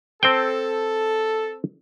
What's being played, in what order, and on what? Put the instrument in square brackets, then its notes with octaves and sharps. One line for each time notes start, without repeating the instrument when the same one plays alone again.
[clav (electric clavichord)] C4 C5 G5 [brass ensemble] A4